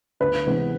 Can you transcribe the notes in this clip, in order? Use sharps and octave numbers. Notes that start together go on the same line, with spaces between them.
D2 B4
C3 E3 G#3 B3